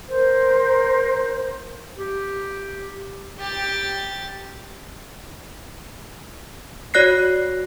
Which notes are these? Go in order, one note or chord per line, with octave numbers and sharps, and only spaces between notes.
A#4 C5
G4
G4 A6
F#4 C#5 D5 F#6 A#6 C7